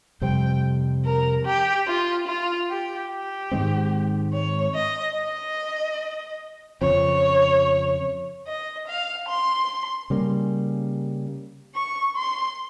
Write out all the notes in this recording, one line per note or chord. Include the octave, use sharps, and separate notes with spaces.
F2 C3 G3 C4 G5
A#4
G4
F4
F4
G4
G4
G#2 D#3 G#3 C4
C#5
D#5
D#5
F2 C#3 F3 C4 C#5
D#5
F5
C6
C#3 G3 A#3 C#4
C#6
C6